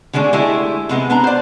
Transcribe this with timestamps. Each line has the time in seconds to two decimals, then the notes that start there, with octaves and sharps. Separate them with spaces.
0.13 D3 G#3 A3 D4 G#4
0.33 G#3 A3 E4 G4
0.89 C3 G#3 B3 C4
1.10 B3 D4 A#5
1.24 C5 D5